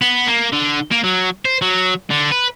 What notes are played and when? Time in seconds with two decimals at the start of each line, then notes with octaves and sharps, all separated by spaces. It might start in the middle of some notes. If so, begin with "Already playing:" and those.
0.02 B3
0.27 A#3
0.53 D3
0.92 A#3
1.04 F#3
1.45 C5
1.62 F#3
2.11 D3
2.32 B4